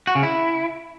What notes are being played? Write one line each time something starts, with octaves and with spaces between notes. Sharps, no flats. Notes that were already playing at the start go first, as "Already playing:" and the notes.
F#4
C#3
E4